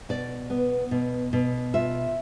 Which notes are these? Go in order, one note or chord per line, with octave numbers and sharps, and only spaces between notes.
B2 D5
B3
B2
B2
F4 E5